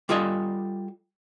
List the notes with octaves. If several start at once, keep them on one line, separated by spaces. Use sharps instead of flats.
G3 F4 A4 D#5 G#5